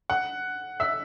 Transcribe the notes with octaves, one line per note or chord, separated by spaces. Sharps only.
F#5
E5